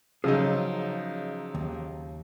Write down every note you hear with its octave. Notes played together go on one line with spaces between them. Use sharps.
C#3 F3 F#3 D#4 G#4 D#5 E6
D#2